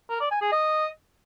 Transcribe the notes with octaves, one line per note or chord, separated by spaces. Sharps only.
A#4
D5
G#5
G#4
D#5